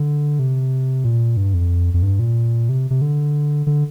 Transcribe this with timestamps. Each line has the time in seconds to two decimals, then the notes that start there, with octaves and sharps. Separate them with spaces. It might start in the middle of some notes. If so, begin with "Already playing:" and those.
Already playing: D3
0.39 C3
1.04 A#2
1.37 G2
1.54 F2
1.94 F2
2.03 G2
2.19 A#2
2.69 C3
2.90 C3
3.01 D3
3.67 D3